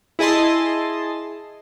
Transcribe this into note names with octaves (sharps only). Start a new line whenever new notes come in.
E4 G#4 D#5 A5 C6